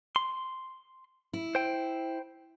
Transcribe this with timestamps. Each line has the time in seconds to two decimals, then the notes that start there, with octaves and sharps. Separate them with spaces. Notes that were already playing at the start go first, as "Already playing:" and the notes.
0.16 C6
1.33 E4
1.55 C5 G5